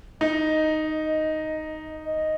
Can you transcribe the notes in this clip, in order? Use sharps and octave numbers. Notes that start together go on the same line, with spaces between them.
D#4 D#5
D#5